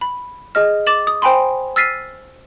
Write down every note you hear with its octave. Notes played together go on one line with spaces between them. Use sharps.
B5
G#4 D#5 F6
D6 A6 E7 F#7
D#6
C5 G5 G#5 B5 C6
E6 F6 A6 B6 C7 D#7